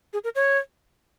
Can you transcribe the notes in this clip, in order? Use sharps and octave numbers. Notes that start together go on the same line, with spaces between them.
G#4
A#4
C#5